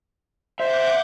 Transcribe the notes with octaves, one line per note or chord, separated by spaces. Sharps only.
C5 E5 F#5 D6 G6